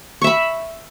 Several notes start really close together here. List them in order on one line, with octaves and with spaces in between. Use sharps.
C#6 E5 B5